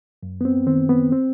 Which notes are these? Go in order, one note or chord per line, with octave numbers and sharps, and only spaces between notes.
F#2
B3
C4
D#3 C4
B3
C4